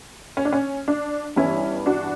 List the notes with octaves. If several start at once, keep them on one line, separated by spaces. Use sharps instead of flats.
C#4
D4
C#4
D4
G2 E3 G3 B3 C#4 E4
D4 F#4